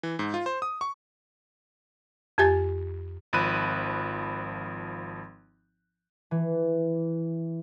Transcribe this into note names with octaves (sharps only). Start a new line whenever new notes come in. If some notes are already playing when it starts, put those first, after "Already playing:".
E3
G#2
F4
C5
D#6
C#6
F2 G4 G#5 A6
G#1 F3 B5 F#6 D#7
E3